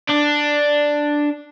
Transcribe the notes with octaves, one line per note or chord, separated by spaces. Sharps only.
D4